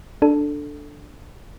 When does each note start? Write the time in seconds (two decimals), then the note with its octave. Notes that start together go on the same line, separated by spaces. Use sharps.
0.22 D4 A4